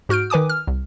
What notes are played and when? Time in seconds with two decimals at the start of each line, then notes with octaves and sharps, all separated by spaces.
0.09 G#2 F#4 F6 G6 D7
0.30 D#3 B4 G#5 D6 D#6
0.49 F6
0.68 C2